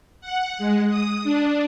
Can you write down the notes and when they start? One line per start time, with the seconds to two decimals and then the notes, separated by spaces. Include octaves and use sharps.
0.21 F#5
0.58 G#3
0.90 D#6
1.24 D4